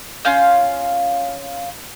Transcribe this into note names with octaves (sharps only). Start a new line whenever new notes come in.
C#4 F4 F5 G6